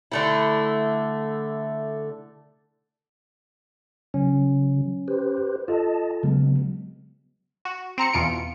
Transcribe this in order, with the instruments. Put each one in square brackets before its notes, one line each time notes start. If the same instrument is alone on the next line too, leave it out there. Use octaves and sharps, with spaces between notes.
[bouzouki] D3 A3 E4
[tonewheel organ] C#3 F#3 [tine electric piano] C#4
[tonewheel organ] G4 B4 C5
[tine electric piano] F4 A4 [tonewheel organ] D#5 A5
[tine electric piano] C#3 G#3 [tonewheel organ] F#3 B3
[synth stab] F#4
C4 A#5 C#7
E2 B2 F4 C#7 D7